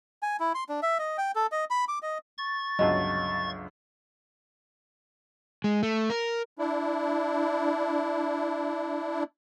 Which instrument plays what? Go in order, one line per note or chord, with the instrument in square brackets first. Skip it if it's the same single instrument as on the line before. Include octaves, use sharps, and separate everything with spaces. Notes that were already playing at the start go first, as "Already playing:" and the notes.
[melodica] G#5
E4
C6
D4
E5
D#5
G5
A4
D#5
B5
D6
D#5
[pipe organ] C#6 A6
[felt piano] G1 C#2 F#3 [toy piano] D#5 A5
[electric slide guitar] G#3
A3
A#4
[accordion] D4 E4